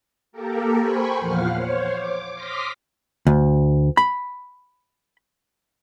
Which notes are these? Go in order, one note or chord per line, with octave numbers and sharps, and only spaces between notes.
A#3 G4 A4 A#4
C5 G5 G#5 B5 C#6
E2 A#2 F3 F5 F#5 F6
C5 C#5
D6
C6 D6 D#6 F6 A#6 B6
D2
B5